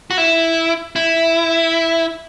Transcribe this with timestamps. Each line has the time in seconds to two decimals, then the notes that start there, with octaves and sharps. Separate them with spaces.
0.11 F#4
0.18 E4
0.96 E4